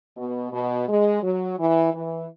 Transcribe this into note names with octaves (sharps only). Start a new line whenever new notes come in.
B2
B2
G#3
F#3
E3
E3